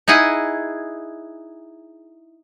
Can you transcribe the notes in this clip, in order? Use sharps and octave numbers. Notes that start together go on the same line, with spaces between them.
D#4 E4 G#4 F#5 G#5